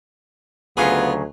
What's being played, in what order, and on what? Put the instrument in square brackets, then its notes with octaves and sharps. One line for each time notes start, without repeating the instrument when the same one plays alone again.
[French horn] D2 [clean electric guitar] C#3 F#3 [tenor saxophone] B3 [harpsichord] F4 G#4